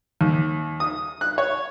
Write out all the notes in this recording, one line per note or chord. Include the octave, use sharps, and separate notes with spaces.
D#2
D#6
F#6
C#5